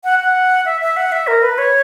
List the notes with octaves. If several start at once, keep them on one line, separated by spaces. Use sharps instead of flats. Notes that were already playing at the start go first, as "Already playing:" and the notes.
F#5
F#5
E5
E5
F#5
E5
A#4
B4
C#5